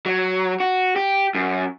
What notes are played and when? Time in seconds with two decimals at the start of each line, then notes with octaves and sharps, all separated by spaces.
0.06 F#3
0.60 F#4
0.96 G4
1.35 F#2